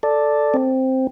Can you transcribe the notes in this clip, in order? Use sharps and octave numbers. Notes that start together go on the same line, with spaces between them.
A4 D5
C4